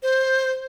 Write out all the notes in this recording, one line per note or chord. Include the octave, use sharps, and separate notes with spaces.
C5